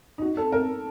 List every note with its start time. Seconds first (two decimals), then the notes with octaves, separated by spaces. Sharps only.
0.18 D#4
0.22 F#4
0.37 A4
0.52 A#4